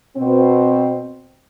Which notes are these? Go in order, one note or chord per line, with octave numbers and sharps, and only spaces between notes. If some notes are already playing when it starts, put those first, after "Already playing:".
B2 C4